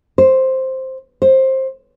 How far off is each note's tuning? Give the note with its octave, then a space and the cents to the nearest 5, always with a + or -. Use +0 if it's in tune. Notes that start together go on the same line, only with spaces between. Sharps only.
C5 +5
C5 +15